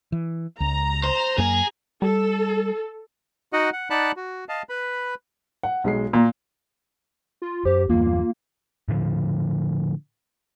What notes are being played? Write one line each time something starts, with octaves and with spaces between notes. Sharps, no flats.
E3
C#2 A#5
C5
F#2 A#3 G#4
G3 A4
D#4 F#4 D#5 F#5
F#5
D#4 D5 F#5 A5 B5 F#6
F#4
D#5 F5 A5
B4 B5
F#5
B1 G#3 C7
A#2 A#5
F4
F#2 G4 C5
E2 G2 A#3 F4
A2 D3 F3